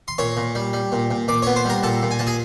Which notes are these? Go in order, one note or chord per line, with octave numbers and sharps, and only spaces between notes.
C6
A#2 C#5 C#6
A#2
G3
G3
A#2
A#2
A#2 D5 D6
B3 C#5 C#6
C5 C6
G3 A#4 A#5
A#2 A4 A5
A#2
G#5
A#2 A5
G#4 G#5